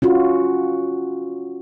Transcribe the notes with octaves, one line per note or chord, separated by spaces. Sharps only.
C#4 F4 F#4